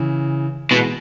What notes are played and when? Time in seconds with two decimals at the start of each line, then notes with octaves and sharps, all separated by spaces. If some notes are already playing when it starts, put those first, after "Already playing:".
Already playing: C#3 E3
0.71 B2 E3 G#3